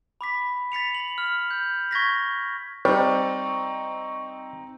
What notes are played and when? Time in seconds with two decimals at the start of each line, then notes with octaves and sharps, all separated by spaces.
0.21 B5 D6 B6
0.72 A6 B6 C#7 F7
0.94 F#7
1.18 F6
1.51 G6
1.91 C#6 G#6 A#6 B6
2.85 G3 C4 D#4 C5 C#6